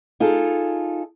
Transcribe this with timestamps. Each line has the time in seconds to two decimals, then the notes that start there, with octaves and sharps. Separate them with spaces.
0.20 D#4 F4 G#4 A4